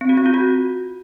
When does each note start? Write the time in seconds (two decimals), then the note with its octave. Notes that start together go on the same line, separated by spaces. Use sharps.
0.01 C4
0.09 F#4
0.17 C4
0.26 F4
0.34 F#4